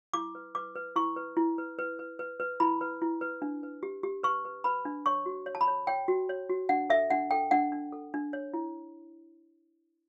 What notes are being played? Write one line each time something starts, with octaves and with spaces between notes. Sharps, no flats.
E4 D6
B4
B4 D6
B4
E4 C#6
B4
E4
B4
B4
B4
B4
B4
E4 B5
B4
E4
B4
D4
B4
G4
G4
B4 C#6
B4
B4 B5
D4
C#5 C#6
F#4
C#5
A5
B5
C#5
C#5 G5
F#4
C#5
F#4
D4 F#5
A4 E5
D4 F#5
A4 G5
D4 F#5
D4
A4
D4
C#5
E4